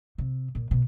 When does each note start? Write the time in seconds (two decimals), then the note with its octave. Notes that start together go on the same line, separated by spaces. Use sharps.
0.18 C3
0.55 A#2
0.71 B2